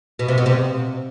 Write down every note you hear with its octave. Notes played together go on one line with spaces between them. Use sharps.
B2
C3
B2
C3